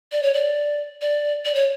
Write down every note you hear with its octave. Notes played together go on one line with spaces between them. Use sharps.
D5
C#5
D5
D5
D5
C#5